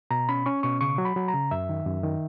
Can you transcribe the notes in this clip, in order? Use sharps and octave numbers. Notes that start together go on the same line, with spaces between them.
B2 A#5
C#4 B5
C#4 C#6
B2 C#6
C#3 C#6
F#3
B5
F#3
A#5
C#3
F#2 E5
D#3
F#2
D#3